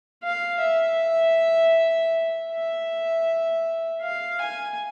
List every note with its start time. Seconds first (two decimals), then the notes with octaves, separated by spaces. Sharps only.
0.23 F5
0.61 E5
2.51 E5
4.02 F5
4.41 G#5